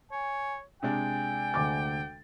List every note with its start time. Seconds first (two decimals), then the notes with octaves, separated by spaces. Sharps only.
0.11 C#5 G#5
0.83 C3 G#3 D4 G5 G#5
1.54 D2 D6 A6